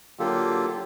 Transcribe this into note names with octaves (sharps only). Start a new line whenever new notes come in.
D3 F#3 A#3 F4 G4 A4